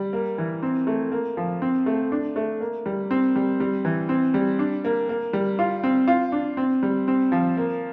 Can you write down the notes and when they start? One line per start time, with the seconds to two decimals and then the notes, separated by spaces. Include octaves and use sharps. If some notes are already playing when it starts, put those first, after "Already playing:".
Already playing: G3
0.13 A#3
0.38 E3
0.62 C4
0.87 A3
1.12 A#3
1.37 F3
1.62 C4
1.86 A3
2.12 D4
2.36 A3
2.61 A#3
2.86 G3
3.11 C4
3.36 G3
3.60 G3
3.85 E3
4.09 C4
4.34 G3
4.59 D4
4.85 A#3
5.09 A#3
5.33 G3
5.59 F4
5.83 C4
6.08 F4
6.32 D4
6.57 C4
6.83 G3
7.08 C4
7.32 F3
7.57 A#3